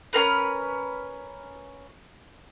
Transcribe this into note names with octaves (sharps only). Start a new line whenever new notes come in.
C#4 D4 A#4 B4